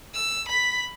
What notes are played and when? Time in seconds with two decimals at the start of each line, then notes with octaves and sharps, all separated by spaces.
0.15 E6
0.49 B5 B6